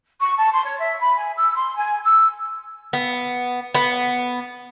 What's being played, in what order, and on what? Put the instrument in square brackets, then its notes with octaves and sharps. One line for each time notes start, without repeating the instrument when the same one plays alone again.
[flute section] C#6
A5
C6
C#5
E5
B5
G#5
E6
C6
G#5
E6
[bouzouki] B3
B3